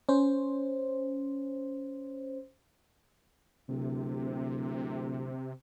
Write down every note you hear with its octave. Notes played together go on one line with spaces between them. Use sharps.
C#4 C5
D1 C3